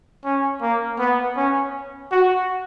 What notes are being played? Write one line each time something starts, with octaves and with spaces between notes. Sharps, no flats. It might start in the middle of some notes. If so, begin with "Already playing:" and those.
C#4
A#3
B3
C#4
F#4